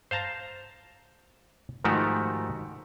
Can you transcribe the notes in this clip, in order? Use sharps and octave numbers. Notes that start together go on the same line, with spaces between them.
C5 F5 A5 A#5
G#2 D#3 F3 A3 F#4 G4